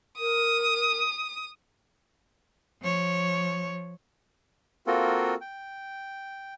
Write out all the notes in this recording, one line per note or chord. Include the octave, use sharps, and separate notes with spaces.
A#4 D#6
F3 C#5
A#3 C4 F4 F#4 A4 A#4
G5